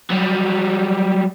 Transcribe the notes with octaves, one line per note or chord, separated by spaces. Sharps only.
F#3 G3